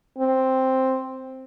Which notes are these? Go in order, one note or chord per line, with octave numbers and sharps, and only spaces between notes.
C4